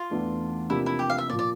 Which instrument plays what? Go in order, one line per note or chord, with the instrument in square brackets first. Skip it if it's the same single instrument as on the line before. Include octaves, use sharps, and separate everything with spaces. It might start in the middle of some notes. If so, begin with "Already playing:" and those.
Already playing: [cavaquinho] F4
[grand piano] E2 E3 A3 D4
[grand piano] C3 F3 A#3 D4 G4 [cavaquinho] E4
[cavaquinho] E4
G4
F5
E5
[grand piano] A#2 F3 A#3 [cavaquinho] D5
[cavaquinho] D5